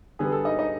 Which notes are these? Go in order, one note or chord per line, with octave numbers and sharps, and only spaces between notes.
D3 G3 B3 G#4
A4
D#4 D#5
D#4 D#5